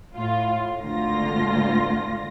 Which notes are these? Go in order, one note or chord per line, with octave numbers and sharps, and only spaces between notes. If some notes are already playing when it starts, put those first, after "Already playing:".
A2 F4
G#1 D2 D3 F4 A#6